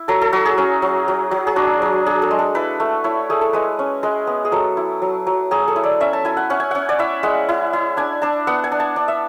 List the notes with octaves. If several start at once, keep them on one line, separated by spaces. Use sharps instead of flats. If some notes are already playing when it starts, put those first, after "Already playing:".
Already playing: E4
F#3 A4
A4
F#3 F#4
G#4
C#4
F#3
F#3
F#3
G#4
D4 F#4
F#3
D4 G#4
A4
G#3
A4
E4 B4
A3
E4 C#5
A3 G#4
A4
G#3 B4
C#4
G#3 B4
B3
G#4
F#3 A4
E4
F#3
F#3
F#3 G#4
A4
E4
D5
C#4 E5
A5
E4 G#5
F#5
C#4 F#5
G#5
C#4 F#5
D5
E4 E5
G#3 F#5
E4
E4
D4 G#5
D4 A5
B3 F#5
G#5
D4
A5
D4
E5